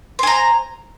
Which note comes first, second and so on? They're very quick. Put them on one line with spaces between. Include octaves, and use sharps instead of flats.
C5 G#5 A#5